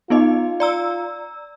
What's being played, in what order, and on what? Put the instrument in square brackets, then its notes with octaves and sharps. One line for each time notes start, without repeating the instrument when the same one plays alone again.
[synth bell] B3 D#4 D#5 [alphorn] F4
[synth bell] D5 A#5 E6